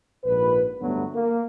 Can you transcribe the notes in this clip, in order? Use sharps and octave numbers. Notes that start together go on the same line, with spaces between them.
A#1 G#2 B4
D2 G2 F#3 A3 B3
A#3